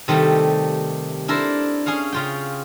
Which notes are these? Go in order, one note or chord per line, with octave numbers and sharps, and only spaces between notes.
C3 D#3 G3 A3
D4 E4 A4 A#4 C5 D5
C#4 G#4 C#5 F5
C#3 F4 G5